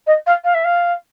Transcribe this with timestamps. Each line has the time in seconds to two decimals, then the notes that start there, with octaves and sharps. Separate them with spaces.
0.06 D#5
0.26 F5
0.44 F5
0.54 E5
0.64 F5